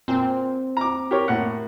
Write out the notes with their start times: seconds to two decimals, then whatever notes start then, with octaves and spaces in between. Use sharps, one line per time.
0.08 A#2 C4
0.77 A#5 D6
1.11 G4 A#4 C#5
1.28 A2 A#3 F#5